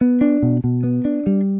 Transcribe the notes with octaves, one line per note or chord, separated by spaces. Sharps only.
B3
D4
B2
B2
B3
D4
G3